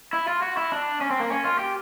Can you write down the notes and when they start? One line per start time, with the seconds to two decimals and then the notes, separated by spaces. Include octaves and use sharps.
0.13 E4
0.28 F4
0.42 F#4
0.57 E4
0.72 D4
1.01 C#4
1.10 C4
1.20 A#3
1.30 C#4
1.44 F4
1.59 G4